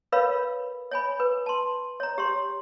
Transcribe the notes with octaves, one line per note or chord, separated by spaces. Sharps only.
A#4 B4 C#5 F5 B5
C#5 G#5 B5
B4
A5 C6
C#5 A#5
G4 C#5 C6